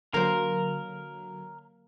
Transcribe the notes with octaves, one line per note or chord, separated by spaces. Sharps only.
D3 F#3 A#3 A#4 C5